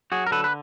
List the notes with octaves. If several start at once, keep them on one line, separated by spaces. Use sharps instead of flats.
F#3 F#4 G#4
A#4
D3 A4 B4
B4